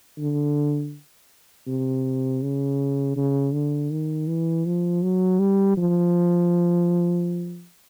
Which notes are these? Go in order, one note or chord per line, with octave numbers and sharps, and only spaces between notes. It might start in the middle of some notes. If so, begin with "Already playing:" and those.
D3
C3
C#3
C#3
D3
D#3
E3
F3
F#3
G3
F3